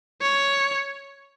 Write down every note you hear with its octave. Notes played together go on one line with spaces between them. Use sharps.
C#5